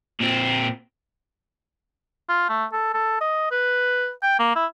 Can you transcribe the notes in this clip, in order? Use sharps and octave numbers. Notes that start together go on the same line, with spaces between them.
A#2 C4
F4
A3
A4
A4
D#5
B4
G5
A#3
E4